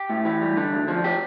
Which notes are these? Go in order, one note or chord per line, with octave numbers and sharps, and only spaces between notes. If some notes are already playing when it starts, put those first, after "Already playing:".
Already playing: G4
A2
E3
G3
D3
D2
F3
G4